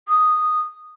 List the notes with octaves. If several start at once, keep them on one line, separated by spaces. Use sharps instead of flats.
D#6